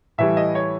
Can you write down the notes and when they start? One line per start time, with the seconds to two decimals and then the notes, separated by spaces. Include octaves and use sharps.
0.18 A2 E3 G3 E5
0.37 D#5
0.55 C#5